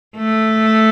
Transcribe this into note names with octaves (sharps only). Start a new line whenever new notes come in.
A3